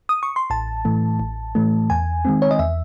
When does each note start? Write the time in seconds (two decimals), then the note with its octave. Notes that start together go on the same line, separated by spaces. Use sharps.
0.09 D#6
0.23 C#6
0.36 C6
0.50 A1 A5
0.85 A2 E3 A3
1.20 A1
1.55 A2 E3 A3
1.90 E2 G#5
2.25 D#3 G#3 C4
2.42 C#5
2.51 D#5
2.59 E2 E5